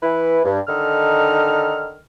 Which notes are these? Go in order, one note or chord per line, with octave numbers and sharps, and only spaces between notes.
E3 E4 B4
G2
D3 D#3 D#4 A4 F6